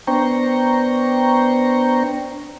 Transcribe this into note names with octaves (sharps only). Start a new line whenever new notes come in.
B3 D4 C5 G5 A#5 C#6